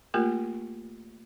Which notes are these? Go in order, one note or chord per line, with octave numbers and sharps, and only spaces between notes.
A3 A#3 F4 G4 A#4